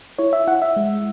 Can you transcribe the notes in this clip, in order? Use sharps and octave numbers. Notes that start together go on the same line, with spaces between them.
E4 C#5
E5
E4 F#5
E5
G#3